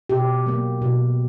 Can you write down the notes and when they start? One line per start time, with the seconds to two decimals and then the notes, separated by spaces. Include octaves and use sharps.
0.09 B2 G4
0.46 F#3 A#3
0.82 B2